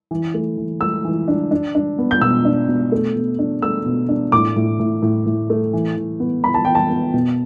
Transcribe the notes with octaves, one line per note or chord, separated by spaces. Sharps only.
E3
A3
E3
A3 E6
E3
D4
D4
D4
B3
G6
B2 E6
D4
B2
A3
B2
D4
A3 E6
B2
D4
A2 D6
A2
A2
A2
A2
A3
E3
E3
B3
E3 B5
A5
B3 G5
A5
B3
B2